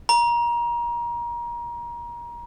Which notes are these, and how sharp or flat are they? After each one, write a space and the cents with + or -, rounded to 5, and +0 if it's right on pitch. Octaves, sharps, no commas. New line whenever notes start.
A#5 +30